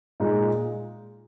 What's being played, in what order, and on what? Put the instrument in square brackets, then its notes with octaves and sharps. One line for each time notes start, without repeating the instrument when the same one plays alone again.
[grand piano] A#2 G#3 D#4 G#4